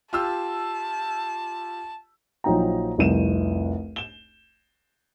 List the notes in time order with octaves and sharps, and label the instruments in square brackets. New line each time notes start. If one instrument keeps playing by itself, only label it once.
[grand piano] F4 G4 E6 [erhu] A5
[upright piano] A#1 F3 F#3 D#4 G5 A#5
F1 C2 D#7 E7
E7 G7